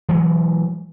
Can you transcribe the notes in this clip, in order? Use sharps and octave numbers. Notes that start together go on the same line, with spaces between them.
E3 F#3 G#3